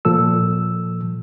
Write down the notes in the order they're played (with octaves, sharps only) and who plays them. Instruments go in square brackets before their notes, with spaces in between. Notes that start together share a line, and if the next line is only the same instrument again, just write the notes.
[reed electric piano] A#2 F3 A4 E6